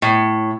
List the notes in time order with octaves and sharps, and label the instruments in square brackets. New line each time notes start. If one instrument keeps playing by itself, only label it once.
[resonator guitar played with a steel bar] A2